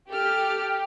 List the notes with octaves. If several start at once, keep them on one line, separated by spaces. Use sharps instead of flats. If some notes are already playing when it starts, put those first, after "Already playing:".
G4 A4 F6